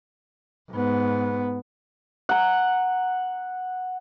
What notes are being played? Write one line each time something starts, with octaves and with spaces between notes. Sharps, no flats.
G#2 B3
F#5 A#5